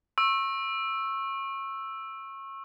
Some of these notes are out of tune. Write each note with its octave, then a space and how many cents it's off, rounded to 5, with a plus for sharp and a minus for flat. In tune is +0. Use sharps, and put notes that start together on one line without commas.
C#6 -30 E6 +0